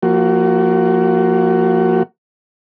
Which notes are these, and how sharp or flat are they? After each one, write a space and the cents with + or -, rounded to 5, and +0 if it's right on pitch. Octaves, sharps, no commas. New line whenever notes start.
F3 +0 A#3 -10 F#4 +25